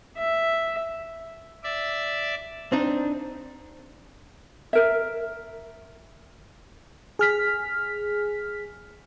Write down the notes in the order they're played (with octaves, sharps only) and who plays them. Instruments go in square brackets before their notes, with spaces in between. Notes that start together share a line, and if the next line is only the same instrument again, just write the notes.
[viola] E5
[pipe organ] D5 E5
[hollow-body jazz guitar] C4 D4 D#4
[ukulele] A#4 E5
[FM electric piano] G#4 F6 B6